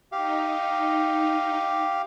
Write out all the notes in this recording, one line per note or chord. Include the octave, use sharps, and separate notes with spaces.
D#4 G4 F5